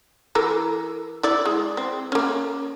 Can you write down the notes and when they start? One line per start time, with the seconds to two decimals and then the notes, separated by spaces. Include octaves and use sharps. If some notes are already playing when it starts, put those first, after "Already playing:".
0.35 E3 A4 A#4
1.23 E4 D5
1.46 G#3
1.77 C4
2.12 A#3 C#4